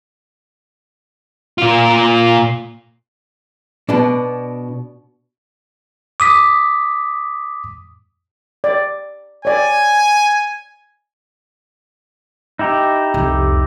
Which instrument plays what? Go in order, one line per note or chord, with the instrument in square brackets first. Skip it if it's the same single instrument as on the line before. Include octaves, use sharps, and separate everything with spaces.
[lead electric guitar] A#2 F4
[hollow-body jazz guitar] B2 D4
[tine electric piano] D6 D#6 B6
[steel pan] D5
[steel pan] C#5 D5 [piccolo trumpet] G#5
[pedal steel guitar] D#4 E4 G4
[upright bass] C2 F2